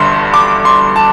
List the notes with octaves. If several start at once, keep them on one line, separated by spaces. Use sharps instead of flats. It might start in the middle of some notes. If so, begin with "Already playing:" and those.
Already playing: G1 G2 D3 C6
D6
C6
A5